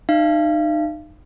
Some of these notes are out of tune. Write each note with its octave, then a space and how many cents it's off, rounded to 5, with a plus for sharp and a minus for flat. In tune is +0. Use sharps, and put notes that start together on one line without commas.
D#4 -30 F5 -35